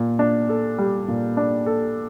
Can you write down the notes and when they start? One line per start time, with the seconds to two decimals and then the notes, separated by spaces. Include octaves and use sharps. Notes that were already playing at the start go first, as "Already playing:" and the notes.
Already playing: A#2
0.19 D4
0.49 A4
0.78 G3
1.08 A#2
1.37 D4
1.66 A4